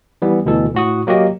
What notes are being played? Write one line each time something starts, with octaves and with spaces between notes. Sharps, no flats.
E3 G3 B3
D2 B2 E3 A4
A2 F#4 D#6
F#3 A#3 F#4 G4 D#5